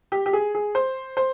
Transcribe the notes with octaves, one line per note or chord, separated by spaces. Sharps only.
G4
G4
G#4
G#4
C5
C5